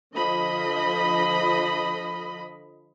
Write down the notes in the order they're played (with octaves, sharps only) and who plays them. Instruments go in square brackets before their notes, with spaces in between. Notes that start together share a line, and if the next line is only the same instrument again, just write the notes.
[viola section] D3 F3 D#5 B5